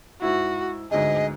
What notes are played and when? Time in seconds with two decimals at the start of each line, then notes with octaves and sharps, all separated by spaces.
0.22 G#2 E4 F#4
0.91 G1 D2 G#2 G#4 D#5